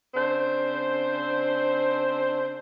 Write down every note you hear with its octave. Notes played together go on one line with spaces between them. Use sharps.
C#3 C4 D4 C5